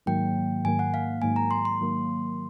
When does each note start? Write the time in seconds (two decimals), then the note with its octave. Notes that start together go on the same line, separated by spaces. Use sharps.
0.06 G#2 D#3 F#3 A#3 G5
0.64 G#2 D#3 F#3 A#3 G#5
0.79 F#5
0.94 F5
1.22 G#2 D#3 F#3 A#3 G#5
1.36 A#5
1.51 C6
1.65 C6
1.80 G#2 D#3 F#3 A#3